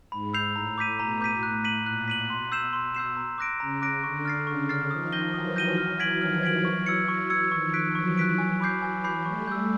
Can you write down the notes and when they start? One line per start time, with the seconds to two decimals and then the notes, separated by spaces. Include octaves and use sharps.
0.12 G#2 B5
0.34 E6 G6 C7 F7
0.56 A2 A#5
0.78 D6 G6 B6 D#7
0.99 B2 A#5
1.21 D6 G6 B6 D#7
1.43 A2 F#6
1.64 B6 D#7 F#7
1.86 A#2 F#6
2.08 B6 D#7 F#7
2.29 B2 C6
2.52 E6 G6 C7 E7
2.73 C6
2.95 E6 G6 C7 E7
3.17 A#5
3.38 D6 F#6 A#6 D7
3.60 C#3 A#5
3.82 D6 F#6 A#6 D7
4.03 D3 C#6
4.25 F6 A6 C7
4.47 C#3 C#6
4.69 F6 A6 C7
4.90 D#3 F3 D#6
5.12 G6 A#6 D#7 G7
5.34 E3 F#3 D#6
5.56 G6 A#6 D#7 G7
5.78 F6
6.00 G#6 B6 D7 F#7
6.21 D#3 F3 F6
6.43 G#6 B6 D7 F#7
6.64 E3 F#3 C#6
6.86 E6 G#6 C#7
7.08 E3 F#3 C#6
7.30 E6 G#6 C#7
7.51 D#3 F3 C#6
7.74 F#6 B6 D7
7.95 E3 F#3 C#6
8.17 F#6 B6 D7
8.38 G#5
8.61 B5 D6 G6 C7
8.82 G#5
9.04 B5 D6 G6 C7
9.26 G3 A3 C#6
9.48 E6 G6